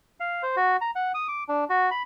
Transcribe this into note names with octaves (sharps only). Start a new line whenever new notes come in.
F5
C5
F#4
A#5
F#5
D#6
D6
D4
F#4
B5